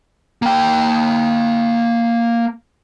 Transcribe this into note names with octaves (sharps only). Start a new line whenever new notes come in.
A#3 G5